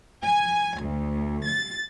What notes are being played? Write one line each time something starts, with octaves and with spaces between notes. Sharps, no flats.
G#5
D2
A6